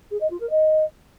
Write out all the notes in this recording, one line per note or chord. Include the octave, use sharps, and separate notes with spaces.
G#4
D#5
F4
A#4
D#5